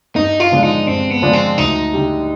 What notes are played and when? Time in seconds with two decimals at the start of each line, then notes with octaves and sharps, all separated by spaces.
0.16 G2 D#4
0.40 F4
0.52 D3 F3 G#3 D4
0.63 D#4
0.87 G2 C4
1.10 B3
1.22 D3 F3 G#3 D4
1.33 C4
1.57 D2 D#4
1.93 D3 G3